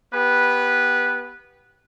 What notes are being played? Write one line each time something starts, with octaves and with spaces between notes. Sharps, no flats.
B3 G4 B4